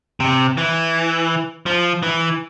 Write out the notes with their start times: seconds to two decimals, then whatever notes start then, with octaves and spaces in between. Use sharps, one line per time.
0.20 C3
0.57 E3
1.66 F3
2.03 E3